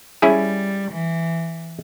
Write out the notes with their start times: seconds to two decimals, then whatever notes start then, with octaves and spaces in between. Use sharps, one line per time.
0.22 G3 C#4 E4 G#4
0.91 E3